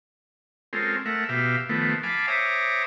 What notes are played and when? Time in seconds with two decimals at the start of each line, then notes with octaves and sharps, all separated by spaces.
0.73 G#3 C4 C#4 F4 A4 A#4
1.05 A3 A#4 E5 F#5
1.29 B2 G4 E5 F5
1.69 D#3 F3 A3 B3
2.03 F5 G#5 A5 B5 D6
2.28 C5 C#5 E5 A#5 D6 D#6